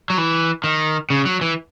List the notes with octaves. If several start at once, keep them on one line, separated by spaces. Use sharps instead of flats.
F#3
E3
D#3
C#3
F#3
E3